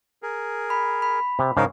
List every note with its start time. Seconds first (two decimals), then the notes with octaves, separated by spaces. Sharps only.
0.23 G#4 A#4
0.70 B5
1.02 B5
1.39 C3
1.57 G#2 C#3 D#4 A#4 F5